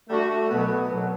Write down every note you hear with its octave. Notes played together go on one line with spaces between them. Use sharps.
D3 G3 A3 D4 F#4
C2 B2 F#3 B3
C2 B2 F#3